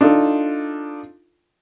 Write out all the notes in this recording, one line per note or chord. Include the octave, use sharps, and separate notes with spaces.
D4 D#4 F4 A4